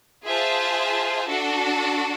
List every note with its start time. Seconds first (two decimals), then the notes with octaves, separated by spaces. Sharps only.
0.25 F4 G#4 C5 E5 A5
1.26 D4 F#4 A4